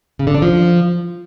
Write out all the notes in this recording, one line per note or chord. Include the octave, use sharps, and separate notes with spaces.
C#3
D3
D4
F3